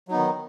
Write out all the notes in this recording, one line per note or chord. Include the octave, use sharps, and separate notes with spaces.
D#3 F#3 B3 D#4